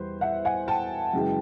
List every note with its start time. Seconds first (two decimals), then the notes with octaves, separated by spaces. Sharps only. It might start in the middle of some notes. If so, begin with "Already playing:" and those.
Already playing: E2 E3 G3 B4 C5
0.21 E5 F#5
0.45 F#5 G#5
0.68 G5 A5
1.13 F#2 C#3 E3 G#3